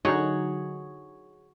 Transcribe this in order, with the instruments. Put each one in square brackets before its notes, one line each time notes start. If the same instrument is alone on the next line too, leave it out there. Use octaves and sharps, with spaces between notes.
[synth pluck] D3 F#3 D#4 [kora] F#4 G#4 C#5